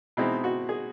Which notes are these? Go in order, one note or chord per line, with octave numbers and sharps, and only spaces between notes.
B2 G#3 C4 D#4 E4
F#4
G#4